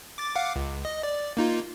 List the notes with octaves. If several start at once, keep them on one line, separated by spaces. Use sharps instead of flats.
D6 A6
F5 F#5 D6
C#2
D#5
D5
A#3 D#4 F4